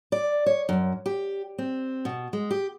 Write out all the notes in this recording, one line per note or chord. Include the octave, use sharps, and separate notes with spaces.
D5
C#5
F#2
G4
C4
B2
G#3
G4